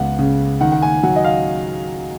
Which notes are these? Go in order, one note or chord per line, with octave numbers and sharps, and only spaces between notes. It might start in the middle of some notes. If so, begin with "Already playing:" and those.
Already playing: C#2 G#3 B3 F#5
C#3
D#3 F#5
F#5
G#5
F#3 F#5
D#5
F5